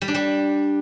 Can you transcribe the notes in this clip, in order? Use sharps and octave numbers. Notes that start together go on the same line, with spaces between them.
G3
D4
G3